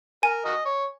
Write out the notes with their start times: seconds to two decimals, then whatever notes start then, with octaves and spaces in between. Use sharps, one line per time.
0.23 A#4 G#5
0.45 F#4 A#4 D#5
0.65 C#5